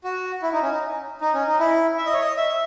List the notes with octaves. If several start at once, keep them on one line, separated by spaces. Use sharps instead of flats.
F#4
E4
D#4
C#4
D#4
D#4
C#4
D#4
E4
E5
D#5
C#5
D#5
E5